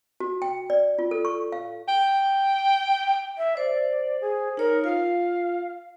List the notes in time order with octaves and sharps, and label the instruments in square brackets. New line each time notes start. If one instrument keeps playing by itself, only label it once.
[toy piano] F#4
G5
D5
F4
A4
C#6
F5
[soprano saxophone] G5
[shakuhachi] E5
[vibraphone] C5 [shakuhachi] D5
[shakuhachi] G#4
[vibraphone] D#4 C#5 [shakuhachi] A#4
[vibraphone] F4 [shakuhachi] F5